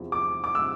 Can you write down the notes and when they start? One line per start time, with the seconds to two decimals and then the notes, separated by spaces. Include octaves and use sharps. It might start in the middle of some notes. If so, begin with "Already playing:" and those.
Already playing: E2 C3 F3
0.12 D6
0.44 D6
0.55 C3 F3 E6